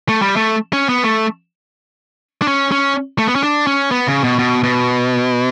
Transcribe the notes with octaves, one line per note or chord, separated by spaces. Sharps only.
A3
G3
A3
C#4
B3
A3
D4
C#4
C#4
A3
B3
C#4
D4
C#4
B3
C#3
B2
B2
B2